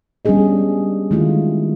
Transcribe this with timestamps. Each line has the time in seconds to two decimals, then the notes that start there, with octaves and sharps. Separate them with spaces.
0.25 G3 B3 C#4 D4 G#4 D#5
1.11 D#3 G#3 A3 E4 F4